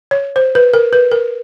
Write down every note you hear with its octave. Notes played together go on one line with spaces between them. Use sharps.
C#5
C5
B4
A#4
B4
A#4